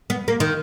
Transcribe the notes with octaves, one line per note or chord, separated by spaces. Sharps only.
B3
A#3
D#3